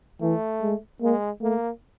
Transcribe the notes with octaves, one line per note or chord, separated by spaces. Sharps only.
E3 A3
G#3
G#3 A#3
A3 A#3